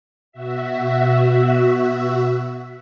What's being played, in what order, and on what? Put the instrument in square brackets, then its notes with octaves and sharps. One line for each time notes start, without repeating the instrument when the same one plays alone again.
[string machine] B2 F#4 E5